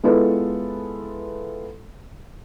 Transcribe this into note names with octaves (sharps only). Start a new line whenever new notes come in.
G#3 B3 E4 F4 A4 B4